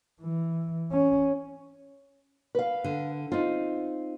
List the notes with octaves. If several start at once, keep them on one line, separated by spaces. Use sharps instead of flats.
E3
C#4
B4 F5
D3
C4 D#4 F4